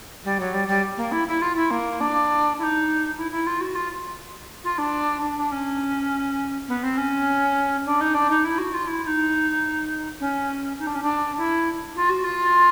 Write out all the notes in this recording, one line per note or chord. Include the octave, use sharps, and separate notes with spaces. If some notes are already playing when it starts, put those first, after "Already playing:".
G3
F#3
G3
G3
A#3
E4
E4
F4
E4
A#3
D4
E4
D#4
E4
E4
F4
F#4
F4
F4
D4
D4
D4
C#4
B3
C4
C#4
D4
D#4
D4
D#4
E4
F#4
F4
E4
E4
D#4
C#4
D#4
D4
C#4
D4
E4
F4
F#4
F4